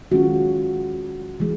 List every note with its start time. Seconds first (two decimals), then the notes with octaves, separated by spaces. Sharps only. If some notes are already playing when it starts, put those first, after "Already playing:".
0.11 D#3 G#3 C#4 F4 F#4
1.40 E3 G#3